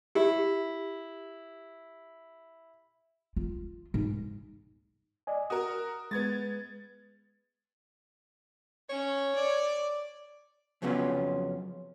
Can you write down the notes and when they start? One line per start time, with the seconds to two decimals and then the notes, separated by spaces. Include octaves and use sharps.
0.15 E4 G4
3.36 F4
3.94 G#2
5.27 D5 D#5 G#5
5.50 F#4 A#4 D#6
6.11 G#3 B3 G#6 A6
8.89 C#4 C#5
9.35 D5
10.82 F2 C#3 F#3 B3 C#4 F4